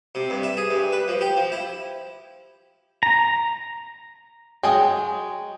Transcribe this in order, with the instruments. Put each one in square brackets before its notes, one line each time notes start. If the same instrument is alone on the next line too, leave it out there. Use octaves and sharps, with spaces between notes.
[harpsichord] C3
G2
E5
G#4
G2
B4
F3
G4
F3
E4
[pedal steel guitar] A#5
[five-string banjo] F#3 G#3 [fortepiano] G5 G#5 D#6